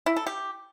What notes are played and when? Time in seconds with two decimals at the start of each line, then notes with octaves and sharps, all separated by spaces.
0.06 E4
0.16 A4
0.27 G4